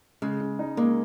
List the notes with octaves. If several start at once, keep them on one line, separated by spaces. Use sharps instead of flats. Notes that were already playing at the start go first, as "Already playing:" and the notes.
C#3 G#3
C#3
D#4
G#3 A#3